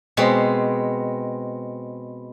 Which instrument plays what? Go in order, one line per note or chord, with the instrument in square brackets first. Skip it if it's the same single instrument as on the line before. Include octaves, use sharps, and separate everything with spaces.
[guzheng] B2 G#3 C4